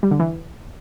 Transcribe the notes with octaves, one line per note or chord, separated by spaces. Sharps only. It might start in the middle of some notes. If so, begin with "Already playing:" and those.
G3
D3
E3